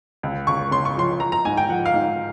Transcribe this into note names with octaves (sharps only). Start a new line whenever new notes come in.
C#2
C#2 C#6
C#3 C6
C#6
F3 C6
F3 A#5
A#5
G#2 G#5
G5
F3 F#5
F5
G#2